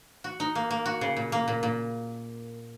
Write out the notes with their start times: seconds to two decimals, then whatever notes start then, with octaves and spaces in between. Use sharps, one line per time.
0.24 F#4
0.40 D#4
0.55 A#3
0.71 A#3
0.86 F#4
1.01 C#3
1.17 A#2
1.32 A#3
1.48 A#2
1.63 A#2